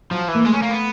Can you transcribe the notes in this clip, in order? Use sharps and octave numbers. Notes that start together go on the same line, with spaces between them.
F3 F#3
E3
A#3
G#3 A3
C#4
A#3
B3